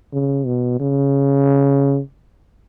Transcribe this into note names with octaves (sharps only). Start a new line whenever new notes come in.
C#3
B2
C#3